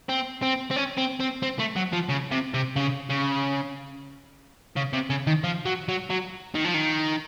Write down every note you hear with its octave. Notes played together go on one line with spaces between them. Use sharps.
C4
C4
C4
C#4
C4
C4
C4
A3
F#3
F3
C#3
C3
C3
C#3
C#3
C#3
C3
C#3
D#3
F3
F#3
F#3
F#3
D#3
F3
D#3